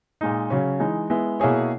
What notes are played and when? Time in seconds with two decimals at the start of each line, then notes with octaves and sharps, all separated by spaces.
0.21 A#2 G#3 D#4
0.50 C#3 F#3 C#4
0.80 E3 G#3 D#4
1.10 G#3 B3 E4
1.40 B2 A#3 E4 G#4 C#5